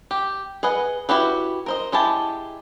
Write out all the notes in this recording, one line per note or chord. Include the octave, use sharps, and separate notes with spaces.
G4
G#4 B4 D#5 F#5
E4 F#4 G4 B4
A#4 C5 D#5
G#3 E4 G4 A5